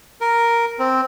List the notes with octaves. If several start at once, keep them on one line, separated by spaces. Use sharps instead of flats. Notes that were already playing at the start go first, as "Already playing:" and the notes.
A#4
C4